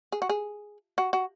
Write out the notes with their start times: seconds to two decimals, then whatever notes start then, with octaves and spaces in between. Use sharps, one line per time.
0.12 G#4
0.22 F#4
0.29 G#4
0.98 F#4
1.13 F#4